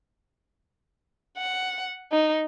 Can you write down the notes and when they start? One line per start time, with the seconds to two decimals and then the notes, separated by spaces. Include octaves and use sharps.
1.37 F#5
2.12 D#4